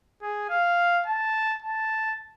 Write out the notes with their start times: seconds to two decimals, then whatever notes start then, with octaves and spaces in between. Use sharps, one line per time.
0.22 G#4
0.49 F5
1.06 A5
1.62 A5